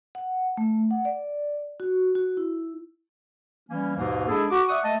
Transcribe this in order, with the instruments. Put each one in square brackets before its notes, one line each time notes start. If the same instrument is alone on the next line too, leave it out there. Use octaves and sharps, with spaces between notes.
[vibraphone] F#5
A3
F#5
D5
F#4
F#4
E4
[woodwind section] E3 G3 A#3 C#4
D#2 G#2 B2 E3 A#3
G#3 D4 E4 G#4 A4
F#4 D6
D5 E5 F#5 C#6 D#6
A3 D#5 A5